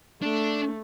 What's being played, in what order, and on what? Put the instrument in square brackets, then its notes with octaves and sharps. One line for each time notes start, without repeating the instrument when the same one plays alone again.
[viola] A3 [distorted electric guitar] D4